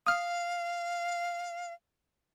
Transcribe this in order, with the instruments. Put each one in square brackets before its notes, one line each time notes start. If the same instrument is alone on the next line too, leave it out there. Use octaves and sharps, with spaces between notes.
[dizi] F5 [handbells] D#6 F6